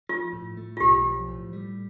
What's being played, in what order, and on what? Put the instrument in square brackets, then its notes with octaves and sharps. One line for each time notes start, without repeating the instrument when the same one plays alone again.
[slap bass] F3 [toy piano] F4
[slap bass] A2
A3
[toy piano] F4
[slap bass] B1 [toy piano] G4
[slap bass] F3
A2
G3